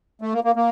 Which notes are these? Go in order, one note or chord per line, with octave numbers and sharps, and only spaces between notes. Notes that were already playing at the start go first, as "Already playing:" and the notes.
A3
A#3
A#3
A#3